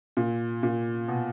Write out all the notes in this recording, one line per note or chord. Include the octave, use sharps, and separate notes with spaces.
A#2
A#2
B2